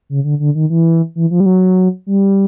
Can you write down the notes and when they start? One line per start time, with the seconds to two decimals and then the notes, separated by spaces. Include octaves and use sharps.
0.09 C#3
0.24 D3
0.40 D3
0.55 D#3
0.70 E3
1.15 E3
1.31 F3
1.40 G3
1.46 F#3
2.07 G3